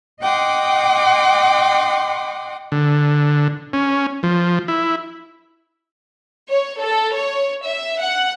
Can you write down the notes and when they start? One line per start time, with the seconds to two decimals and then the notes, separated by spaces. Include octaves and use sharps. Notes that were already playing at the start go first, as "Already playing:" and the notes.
0.21 D#5 F#5 G5 C6 D6 D#6
2.72 D3
3.73 C#4
4.23 F3
4.68 E4
6.50 C#5
6.82 A4
7.16 C#5
7.66 E5
8.02 F#5